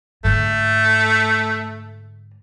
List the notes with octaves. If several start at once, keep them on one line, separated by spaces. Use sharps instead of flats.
G#2 D3 A3